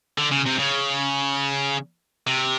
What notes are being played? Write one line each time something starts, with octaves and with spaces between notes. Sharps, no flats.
D3
C#3
C3
C#3
C3